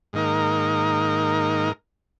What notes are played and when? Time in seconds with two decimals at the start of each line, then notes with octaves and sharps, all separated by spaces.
0.13 G#2 D#3 A#3 D#4 A#4